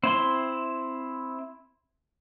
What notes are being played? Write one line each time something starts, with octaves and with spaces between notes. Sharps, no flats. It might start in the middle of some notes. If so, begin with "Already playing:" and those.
C4 E4 C6